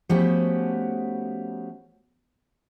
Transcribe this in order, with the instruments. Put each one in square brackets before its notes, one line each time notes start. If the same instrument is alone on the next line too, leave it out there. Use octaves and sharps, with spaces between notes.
[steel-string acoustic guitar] F3 A3 B3 C#4 F#4 G4